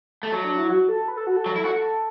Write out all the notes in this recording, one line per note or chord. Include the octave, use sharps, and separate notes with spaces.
A3
F#3
D4
E4
F#4
A4
B4
A4
F#4
A4
F#3
E4
F#4